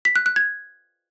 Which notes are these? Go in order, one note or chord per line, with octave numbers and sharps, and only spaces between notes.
B6
F#6
F#6
G#6